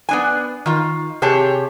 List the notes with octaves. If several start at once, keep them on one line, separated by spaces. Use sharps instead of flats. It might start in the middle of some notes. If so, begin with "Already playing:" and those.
B3 D4 G#5
D#3 F4
C3 G4 G#4 C#5 A5